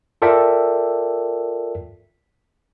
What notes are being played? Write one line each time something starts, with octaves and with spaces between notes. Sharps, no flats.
F4 A4 A#4 D5 E5 G5